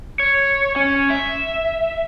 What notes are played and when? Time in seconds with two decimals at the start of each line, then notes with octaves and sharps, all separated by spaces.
0.20 C#5
0.76 C#4
1.10 E5